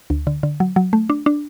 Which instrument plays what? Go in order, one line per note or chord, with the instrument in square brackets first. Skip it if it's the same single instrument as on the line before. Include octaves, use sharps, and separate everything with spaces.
[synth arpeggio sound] D2
D3
D3
F#3
F#3
A3
D4
D4